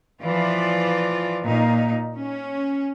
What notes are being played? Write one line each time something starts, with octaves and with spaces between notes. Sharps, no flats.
E3 F3 F4 D5
A#2 D#4
C#4